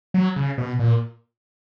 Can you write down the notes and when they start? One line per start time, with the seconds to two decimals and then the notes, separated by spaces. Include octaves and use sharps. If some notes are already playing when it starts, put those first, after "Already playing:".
0.14 F#3
0.36 C#3
0.58 B2
0.79 A#2